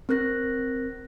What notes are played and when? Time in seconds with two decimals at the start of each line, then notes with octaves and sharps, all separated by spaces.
0.09 C4 A#4 F#6 A#6